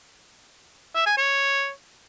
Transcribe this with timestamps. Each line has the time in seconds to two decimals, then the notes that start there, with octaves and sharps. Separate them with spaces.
0.95 E5
1.06 G#5
1.18 C#5